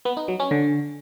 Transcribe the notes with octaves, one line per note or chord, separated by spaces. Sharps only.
B3
D#4
F#3
C#4
D3